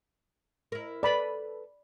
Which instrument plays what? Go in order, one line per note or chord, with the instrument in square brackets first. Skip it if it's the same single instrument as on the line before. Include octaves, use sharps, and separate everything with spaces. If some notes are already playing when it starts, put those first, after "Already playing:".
[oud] E4 A#4
[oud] A4 B4 [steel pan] D5 B5